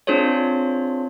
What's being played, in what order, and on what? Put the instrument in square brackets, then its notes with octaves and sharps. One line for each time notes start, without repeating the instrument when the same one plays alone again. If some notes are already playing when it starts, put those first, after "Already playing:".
[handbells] C4 D4 F4 G#4 C5 C#5